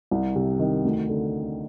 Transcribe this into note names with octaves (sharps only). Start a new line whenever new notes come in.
C2
C3
D#3
D2
D3